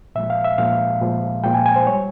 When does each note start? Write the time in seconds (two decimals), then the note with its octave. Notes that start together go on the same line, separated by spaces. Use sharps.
0.15 A#2 F3 G#3 E5
0.30 F5
0.44 E5
0.58 A#2 F3 G#3 F5
1.01 A#2 F3 G#3
1.44 A#2 F3 G#3 G5
1.54 G#5
1.66 G#5
1.76 C5
1.87 G3 C#5